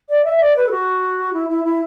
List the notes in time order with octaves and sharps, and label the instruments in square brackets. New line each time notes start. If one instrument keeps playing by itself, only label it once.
[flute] D5
E5
D5
B4
A4
F#4
E4
E4
E4